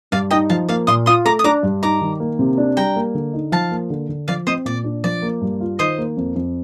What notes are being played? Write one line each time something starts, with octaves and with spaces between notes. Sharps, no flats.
G2 D5 F5
D#4 D#5 G5
F3 F5 A5
A#3 D5 F5
A#2 C6 D#6
F4 C6 D#6
A3 A#5 D6
D#6
D4 A#5 D6
G2
D#4 A#5 D6
D#3
A#3
C3
D4
G3 G5 A#5
A#3
D3
D#4
F3 F5 A5
A#3
D3
D3
F3 D5 F5
C4 C5 D#5
A#2 D5
D4
F3 D5
A#3
G2
F4
D#3 C5 D#5
A#3
F2
F2